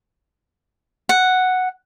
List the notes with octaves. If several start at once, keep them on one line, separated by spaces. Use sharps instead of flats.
F#5